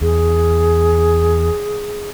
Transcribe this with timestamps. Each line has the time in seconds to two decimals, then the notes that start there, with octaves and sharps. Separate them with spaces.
0.01 E2 G#4